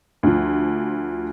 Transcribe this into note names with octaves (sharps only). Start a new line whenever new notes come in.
D2 F3